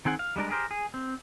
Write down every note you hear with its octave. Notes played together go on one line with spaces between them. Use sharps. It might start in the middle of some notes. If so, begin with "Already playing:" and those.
D#3 C4 G#4 F#5
F5
G3 G#3 D4 A#4
G4 G#4 A#4 C5
G#4
C4